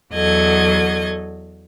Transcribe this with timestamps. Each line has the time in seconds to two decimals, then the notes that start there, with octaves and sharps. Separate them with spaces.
0.14 E2 F#3 A4 D#5 G#6